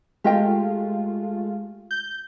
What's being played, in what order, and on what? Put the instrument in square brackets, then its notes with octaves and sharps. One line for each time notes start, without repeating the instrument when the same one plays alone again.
[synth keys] G#3 A3 F4 [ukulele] G4 D#5 G5
[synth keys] G6